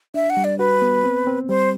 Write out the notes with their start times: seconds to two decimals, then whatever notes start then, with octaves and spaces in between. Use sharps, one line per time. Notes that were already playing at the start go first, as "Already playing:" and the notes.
0.14 D4 E5
0.30 F#5
0.37 G3
0.44 D5
0.59 F#4 B4
0.82 B3
1.04 C4
1.27 C4
1.49 G3 C5